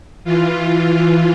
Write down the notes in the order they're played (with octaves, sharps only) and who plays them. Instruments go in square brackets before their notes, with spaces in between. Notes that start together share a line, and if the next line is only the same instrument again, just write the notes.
[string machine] E3 F4